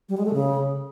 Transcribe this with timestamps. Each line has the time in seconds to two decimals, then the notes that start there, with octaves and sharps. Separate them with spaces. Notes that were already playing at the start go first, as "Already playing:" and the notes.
0.09 G3
0.17 G#3
0.26 A3
0.34 C#3